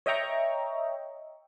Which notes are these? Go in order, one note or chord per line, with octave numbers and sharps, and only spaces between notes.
C#5 D#5 E5 G5 A#5 C#6